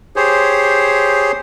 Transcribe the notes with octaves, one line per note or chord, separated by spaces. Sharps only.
G4 G#4 C5 C#5